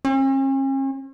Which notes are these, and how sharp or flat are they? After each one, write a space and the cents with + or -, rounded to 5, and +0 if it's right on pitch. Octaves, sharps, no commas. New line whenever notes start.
C#4 -45